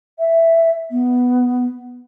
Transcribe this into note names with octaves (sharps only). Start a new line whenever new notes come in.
E5
B3